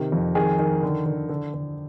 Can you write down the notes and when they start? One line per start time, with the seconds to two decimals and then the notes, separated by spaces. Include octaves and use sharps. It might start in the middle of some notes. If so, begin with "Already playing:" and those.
Already playing: C3 D#3
0.12 F2
0.35 D#3 G#4
0.59 D#3
0.83 D3
1.06 D3
1.29 D3
1.54 D3